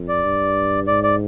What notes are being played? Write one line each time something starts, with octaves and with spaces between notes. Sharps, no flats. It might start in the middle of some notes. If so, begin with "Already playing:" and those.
Already playing: F2
D5
G2
G#2 D5
D5